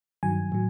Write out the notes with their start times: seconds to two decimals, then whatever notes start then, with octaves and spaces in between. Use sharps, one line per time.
0.23 G2 D#3 F#3 G#5
0.52 A2 F#3